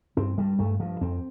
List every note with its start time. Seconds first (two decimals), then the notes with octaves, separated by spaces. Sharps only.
0.17 G2 C4
0.38 G2 G3
0.59 G2 A3
0.80 G2 F3
1.01 F2 C4